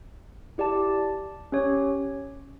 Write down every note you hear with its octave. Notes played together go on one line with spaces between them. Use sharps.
E4 G4 D5 A5
C#4 G4 C#5